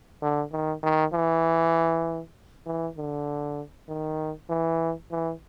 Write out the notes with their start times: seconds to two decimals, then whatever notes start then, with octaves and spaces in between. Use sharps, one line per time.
0.22 D3
0.52 D#3
0.83 D#3
1.13 E3
2.66 E3
2.97 D3
3.89 D#3
4.49 E3
5.11 E3